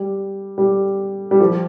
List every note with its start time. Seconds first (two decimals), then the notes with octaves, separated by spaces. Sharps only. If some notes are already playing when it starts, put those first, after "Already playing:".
Already playing: G3
0.58 G3
1.31 G3
1.40 F3